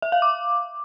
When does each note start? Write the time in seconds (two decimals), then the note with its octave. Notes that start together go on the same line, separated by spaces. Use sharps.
0.02 E5
0.12 F5
0.22 D6